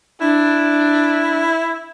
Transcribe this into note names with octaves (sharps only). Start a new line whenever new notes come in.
D4 E4